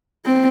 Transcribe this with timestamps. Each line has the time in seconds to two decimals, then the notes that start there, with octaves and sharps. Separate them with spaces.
0.25 C4